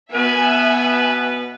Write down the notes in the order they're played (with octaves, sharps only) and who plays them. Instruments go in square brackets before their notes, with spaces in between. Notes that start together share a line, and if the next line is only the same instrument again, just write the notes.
[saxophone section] B2 B4 [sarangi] B3 [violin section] E5 G#5